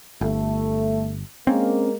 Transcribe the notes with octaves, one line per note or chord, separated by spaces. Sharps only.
G1 A3
G#3 A#3 C4 C#4